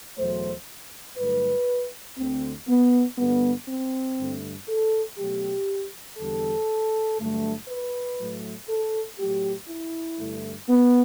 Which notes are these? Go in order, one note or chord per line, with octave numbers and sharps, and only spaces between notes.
E2 B2 F#3 A3 C5
G2 D3 F#3 A3 B4
D2 D3 A3 C4
B3
G2 D3 G3 B3
C4
G2 D3 A3
A4
B2 F#3 A3 G4
E2 D3 G3 A4
G2 D3 F#3 A3
B4
A2 F#3 A3
A4
A2 F#3 A3 G4
E4
G2 D3 A3
B3